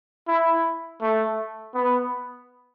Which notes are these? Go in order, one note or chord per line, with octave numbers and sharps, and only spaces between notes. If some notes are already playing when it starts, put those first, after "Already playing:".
E4
A3
B3